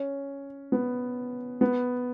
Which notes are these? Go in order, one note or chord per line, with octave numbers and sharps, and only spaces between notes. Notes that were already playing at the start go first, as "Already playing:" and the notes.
Already playing: C#4
B3
B3